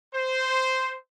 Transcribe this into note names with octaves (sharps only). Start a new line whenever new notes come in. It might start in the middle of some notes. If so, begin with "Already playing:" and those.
C5